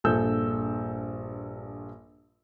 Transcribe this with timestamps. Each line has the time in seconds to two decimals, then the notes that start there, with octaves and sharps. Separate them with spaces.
0.04 A#1 G2 A4 E6 G6